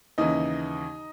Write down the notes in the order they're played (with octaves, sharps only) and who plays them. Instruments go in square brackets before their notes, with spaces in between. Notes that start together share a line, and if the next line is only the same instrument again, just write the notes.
[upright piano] D#2 C#3 E3 D#4 D#5